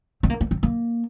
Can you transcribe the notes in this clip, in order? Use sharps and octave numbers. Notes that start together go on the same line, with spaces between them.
C4
A#3
A#3
C4
A#3